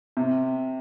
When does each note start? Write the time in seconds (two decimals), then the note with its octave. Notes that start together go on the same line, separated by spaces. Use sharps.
0.17 C3